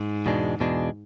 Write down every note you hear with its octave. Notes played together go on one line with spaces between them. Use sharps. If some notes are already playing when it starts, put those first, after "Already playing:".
Already playing: G#2
E2 B2 G#3 D4
E2 B2 G#3 D4